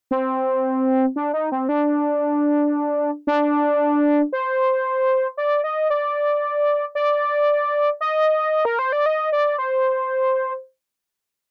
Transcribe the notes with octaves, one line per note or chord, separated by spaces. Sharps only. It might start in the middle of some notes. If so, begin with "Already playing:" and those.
C4
D4
D#4
C4
D4
D4
C5
D5
D#5
D5
D5
D#5
A#4
C5
D5
D#5
D5
C5